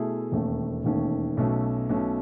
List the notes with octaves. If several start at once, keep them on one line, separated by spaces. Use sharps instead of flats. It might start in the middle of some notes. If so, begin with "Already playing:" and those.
Already playing: B2 A3 E4 G#4
E1 D#2 D#3 A3 C#4
E1 D#2 D#3 A3 C#4
B1 B2 A3 C#4
B1 B2 A3 C#4